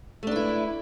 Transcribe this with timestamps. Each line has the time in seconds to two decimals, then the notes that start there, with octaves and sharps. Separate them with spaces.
0.23 A3
0.27 D4
0.31 B4
0.36 E4